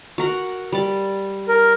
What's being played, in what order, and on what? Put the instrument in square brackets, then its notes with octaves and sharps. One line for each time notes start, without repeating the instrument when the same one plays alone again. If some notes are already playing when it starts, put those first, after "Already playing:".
[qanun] F#4 A#4 F#5
G3 D5
[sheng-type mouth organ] A#4